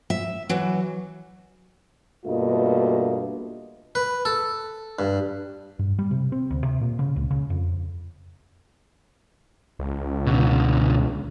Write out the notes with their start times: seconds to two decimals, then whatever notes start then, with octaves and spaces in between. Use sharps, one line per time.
0.10 E5
0.49 E3 F#3
2.25 G2 B2 A3 A#3 F4 D#5
3.95 B4
4.25 A4
4.99 G2
5.79 G2
5.99 G3
6.11 C3
6.32 C4
6.50 D2
6.64 C3
6.81 A#2
6.99 C#3
7.16 C#2
7.31 C#3
7.50 F2
9.79 C#2
10.26 B2 D3